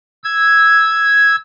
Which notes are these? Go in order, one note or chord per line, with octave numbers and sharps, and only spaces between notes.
E6 G#6